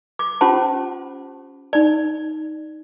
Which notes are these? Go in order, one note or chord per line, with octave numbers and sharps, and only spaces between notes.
D6
C#4 F4 G4 C5 F#5 A5
D#4 D5